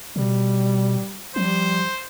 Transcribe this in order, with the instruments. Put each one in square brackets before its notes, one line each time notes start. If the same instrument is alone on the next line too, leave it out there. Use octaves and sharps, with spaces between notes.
[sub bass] B2 [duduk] G3
[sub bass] F3 [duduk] G3 [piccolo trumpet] C5